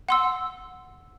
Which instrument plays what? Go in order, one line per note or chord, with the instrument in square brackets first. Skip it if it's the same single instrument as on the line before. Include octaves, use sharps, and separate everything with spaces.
[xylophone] F#5 C6 E6